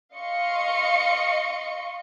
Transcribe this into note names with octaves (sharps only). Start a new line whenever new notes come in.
D#5 F5 C6 C#6 C#7